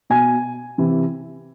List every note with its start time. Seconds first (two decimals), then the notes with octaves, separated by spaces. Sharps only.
0.10 B2 G#5
0.78 C3 E3